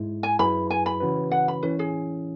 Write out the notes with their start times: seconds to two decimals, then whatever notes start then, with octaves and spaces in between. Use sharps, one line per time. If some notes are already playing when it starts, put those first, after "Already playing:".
Already playing: G#2 G#3 E4
0.23 G#5
0.39 F#2 F#3 E4 G#4 B4 B5
0.70 G#5
0.86 B5
1.00 C#3 E3 C#4 F#4 B4
1.31 F#5
1.48 B5
1.63 E3 C#4 E4 B4
1.79 G#4